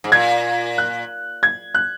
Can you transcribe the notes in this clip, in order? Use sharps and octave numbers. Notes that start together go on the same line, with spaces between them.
G#2
A#2 G#6
F#6
G#6
F#6